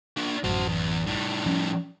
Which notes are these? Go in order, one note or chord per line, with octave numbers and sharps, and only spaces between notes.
A#3 D4
A1 F#2 F#4 C5
E2
A2 G3
F3 C#4